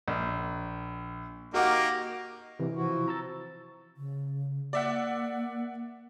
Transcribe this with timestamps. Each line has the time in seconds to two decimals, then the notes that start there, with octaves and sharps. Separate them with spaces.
0.08 A#1
1.54 A#3 D#4 F#4 G4 F#5
2.59 C3 E3
2.76 F3 E4 F#4
3.08 A#5 E6 A6
3.97 C#3
4.73 A#3 D5 E5 F#5